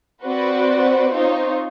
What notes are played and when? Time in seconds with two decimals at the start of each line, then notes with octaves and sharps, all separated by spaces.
0.24 C4 F#4 B4 C5 D5
1.13 C4 D#4 F4 C5 C#5